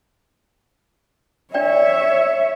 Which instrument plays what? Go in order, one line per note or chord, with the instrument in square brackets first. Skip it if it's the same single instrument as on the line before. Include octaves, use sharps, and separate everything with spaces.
[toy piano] D4 D5 G5 [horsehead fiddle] C#5 E5